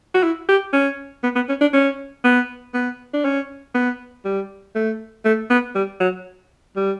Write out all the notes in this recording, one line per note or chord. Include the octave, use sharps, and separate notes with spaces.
F#4
E4
G4
C#4
B3
B3
C#4
D4
C#4
B3
B3
D4
C#4
B3
G3
A3
A3
B3
G3
F#3
G3